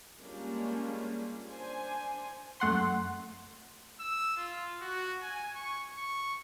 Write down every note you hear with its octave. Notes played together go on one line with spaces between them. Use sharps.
G3 G#3 A#3 C#4 D4 F4
D4 C5 G#5
F#2 A3 F#5 C6
E6
F4
F#4
G#5
C#6
C#6